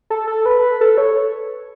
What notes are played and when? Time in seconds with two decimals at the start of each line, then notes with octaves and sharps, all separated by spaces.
0.10 A4
0.27 A4
0.46 B4
0.81 A4
0.98 C#5